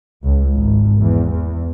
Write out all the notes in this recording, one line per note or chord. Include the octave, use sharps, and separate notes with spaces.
C#2
G#1
E2
E2